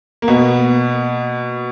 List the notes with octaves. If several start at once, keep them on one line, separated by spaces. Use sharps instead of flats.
A#3
B2 B3